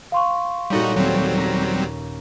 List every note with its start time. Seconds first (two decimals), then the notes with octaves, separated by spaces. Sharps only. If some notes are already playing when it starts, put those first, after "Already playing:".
0.12 F5 C6 C#6
0.70 A#2 G3 D#4 F#4 A4 C#5
0.96 D#2 F#3 G3 C4
1.38 C#4 A#5